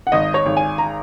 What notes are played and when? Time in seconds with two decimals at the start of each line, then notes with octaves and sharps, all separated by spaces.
0.07 F#5
0.12 G#1 D#5
0.34 C#5
0.46 G#1
0.57 G#5
0.78 A#5